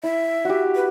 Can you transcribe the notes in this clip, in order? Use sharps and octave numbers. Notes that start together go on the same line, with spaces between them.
E4 E5
F#4 G4
B4